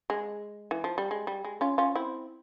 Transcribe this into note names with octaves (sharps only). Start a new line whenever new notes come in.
G#3
E3
F3
G3
G#3
G3
G#3
C#4 F4
C#4 F4
C4 E4